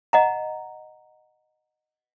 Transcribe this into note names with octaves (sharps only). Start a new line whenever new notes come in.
D#5 F#5 A#5